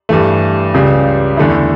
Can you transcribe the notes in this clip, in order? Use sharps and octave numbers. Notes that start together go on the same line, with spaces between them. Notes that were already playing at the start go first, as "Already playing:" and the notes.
G2 E3 A3
C#2 C#3 G3
E2 D3 A3 E4